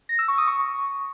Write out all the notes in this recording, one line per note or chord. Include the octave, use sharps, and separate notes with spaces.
A#6
E6
C#6
D#6
C#6